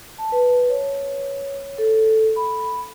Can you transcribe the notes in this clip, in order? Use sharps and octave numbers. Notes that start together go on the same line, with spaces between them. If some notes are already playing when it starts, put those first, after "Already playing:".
A5
B4
C#5
A4
B5